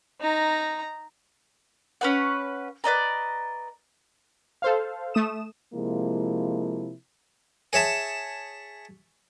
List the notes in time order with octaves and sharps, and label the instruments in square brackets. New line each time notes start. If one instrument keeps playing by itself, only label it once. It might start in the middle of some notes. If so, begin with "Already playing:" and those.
[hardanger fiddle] D#4 A#5
[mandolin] C#4 B4 F#5
B4 D5 D#5 A#5
[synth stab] A4 C5 F5
A3 D#6 E7
[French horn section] C3 F3 G#3 A#3 E4
[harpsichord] G#4 C#5 E5 A5